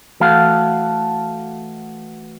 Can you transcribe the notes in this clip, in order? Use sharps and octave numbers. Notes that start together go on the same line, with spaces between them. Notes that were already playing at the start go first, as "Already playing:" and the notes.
E3 A3 F#4 A4 F5